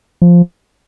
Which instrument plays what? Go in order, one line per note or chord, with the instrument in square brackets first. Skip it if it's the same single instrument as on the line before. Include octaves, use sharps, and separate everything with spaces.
[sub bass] F3